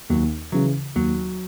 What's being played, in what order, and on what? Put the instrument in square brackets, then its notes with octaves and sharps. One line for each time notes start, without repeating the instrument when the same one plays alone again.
[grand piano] D#2 [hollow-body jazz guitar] F#3
[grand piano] C#3 E3 [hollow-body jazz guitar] F#3
[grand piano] D#2 [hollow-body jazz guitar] F#3